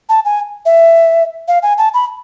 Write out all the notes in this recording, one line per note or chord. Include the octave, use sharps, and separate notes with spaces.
A5
G#5
E5
F5
G#5
A5
B5